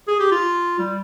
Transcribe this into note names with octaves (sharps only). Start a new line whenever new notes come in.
G#4
G4
F4
G3